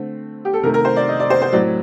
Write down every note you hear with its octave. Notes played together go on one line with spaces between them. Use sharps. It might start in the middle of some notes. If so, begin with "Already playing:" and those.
Already playing: D3 A3 C4
G4
A4
C3 D#3 A3 A#4
A#4
C5
D5
D#5
D5
C5
C5
A2 F#3 C4 D5